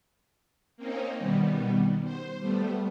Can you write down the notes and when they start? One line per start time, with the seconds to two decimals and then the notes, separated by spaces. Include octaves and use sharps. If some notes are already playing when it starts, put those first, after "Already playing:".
0.77 A#3 C4 C#4 D#4
1.18 B2 D#3 G3 B3
2.03 C5
2.40 G3 A3 B3